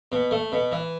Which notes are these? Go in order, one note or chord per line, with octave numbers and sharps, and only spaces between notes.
B2
A3
B2
E3